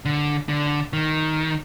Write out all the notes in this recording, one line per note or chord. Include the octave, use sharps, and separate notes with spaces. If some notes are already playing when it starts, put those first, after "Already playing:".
D3
D3
D#3